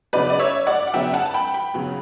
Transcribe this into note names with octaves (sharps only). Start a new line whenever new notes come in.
C#3 F#3 B3 B4 D5
D5
C#5 E5
D5 F#5
F#5
C#3 F#3 B3 E5 G5
F#5 A5
A5
G5 B5
G5 B5
C#3 F#3 B3